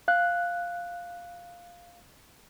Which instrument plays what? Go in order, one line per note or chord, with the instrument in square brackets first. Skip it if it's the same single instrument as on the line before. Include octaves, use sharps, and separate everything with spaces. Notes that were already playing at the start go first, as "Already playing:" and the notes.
[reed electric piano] F5 F#6